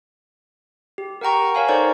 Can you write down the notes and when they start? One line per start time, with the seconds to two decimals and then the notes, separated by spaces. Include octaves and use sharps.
0.98 G4
1.21 A#4 F#5 G5 A#5 C#6
1.55 A#4 C#5 F5 G#5
1.69 D#4 A4 C5 D5 A#5 C#6